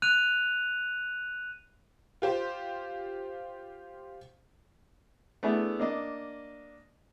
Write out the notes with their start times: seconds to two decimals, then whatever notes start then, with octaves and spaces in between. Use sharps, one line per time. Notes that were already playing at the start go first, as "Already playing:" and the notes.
0.02 F#6 D#7 F7
2.22 F4 G4 C5
5.43 A3 B3 D4 E4 G#4
5.80 A#3 D4 D#5